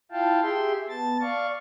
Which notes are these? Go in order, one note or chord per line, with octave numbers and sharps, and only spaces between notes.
E4 F4 F5 G5 A5
G4 G#4 E5 G5 C6
B3 A5 A6
D5 F5 C#6